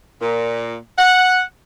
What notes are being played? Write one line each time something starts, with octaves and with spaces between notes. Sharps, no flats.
A#2
F#5